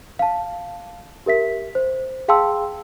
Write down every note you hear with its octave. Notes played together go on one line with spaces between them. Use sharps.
F5 A5
G4 A#4 E5 B6
C5
G#4 F5 G5 A5 C6 E6